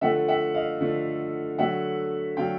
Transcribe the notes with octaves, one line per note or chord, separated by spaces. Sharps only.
D3 F3 A3 E5 F#5
E5 F#5
D#5 F5
D3 F3 A3
D3 F#3 A3 E5 F#5
D3 F#3 A3 F5 G5